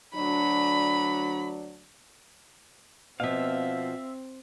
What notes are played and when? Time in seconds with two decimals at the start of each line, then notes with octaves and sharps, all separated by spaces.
0.14 D2 F#3 D4 B5
3.20 B2 F3 C4 E5 F5